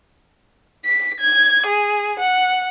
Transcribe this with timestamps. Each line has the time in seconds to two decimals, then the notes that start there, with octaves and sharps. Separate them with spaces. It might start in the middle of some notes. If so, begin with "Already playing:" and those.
0.85 B6
1.20 G#6
1.66 G#4
2.19 F#5